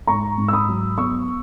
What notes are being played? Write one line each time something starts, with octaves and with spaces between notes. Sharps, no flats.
G#2 A#5 C#6
G#2
E6
B5 D#6
F#3
B3 C#6 E6